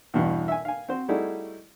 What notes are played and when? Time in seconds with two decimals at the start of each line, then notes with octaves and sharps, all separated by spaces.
0.14 E2 G2 B2 E3
0.48 E5 G#5
0.65 F5 G#5
0.89 C4 F#4 C5
1.08 G3 A3 D#4 E4 F#4 G#4